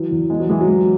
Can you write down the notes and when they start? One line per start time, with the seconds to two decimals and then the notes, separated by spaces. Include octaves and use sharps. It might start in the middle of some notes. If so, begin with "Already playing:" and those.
Already playing: E3 F#3
0.11 E2
0.30 G#3 B3
0.40 F#3
0.49 E3 G#3
0.61 F#3
0.68 G#3